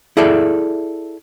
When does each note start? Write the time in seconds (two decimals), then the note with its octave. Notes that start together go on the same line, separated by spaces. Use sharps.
0.17 E4 G#4 A4 D5 E5